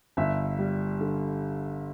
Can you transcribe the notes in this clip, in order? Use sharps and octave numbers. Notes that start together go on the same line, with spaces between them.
G1 E5
G3
D3